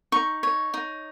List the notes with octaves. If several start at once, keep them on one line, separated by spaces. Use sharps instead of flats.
D#4 C#6
C#5
D#4